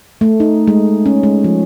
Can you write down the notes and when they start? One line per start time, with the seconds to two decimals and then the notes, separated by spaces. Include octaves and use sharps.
0.21 A3
0.40 D#4
0.68 G#3
1.06 C#4
1.23 G#3
1.44 F3